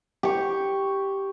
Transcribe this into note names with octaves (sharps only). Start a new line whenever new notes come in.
G4 C#6